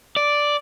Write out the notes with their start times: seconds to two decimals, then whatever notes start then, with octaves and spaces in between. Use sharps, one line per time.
0.16 D5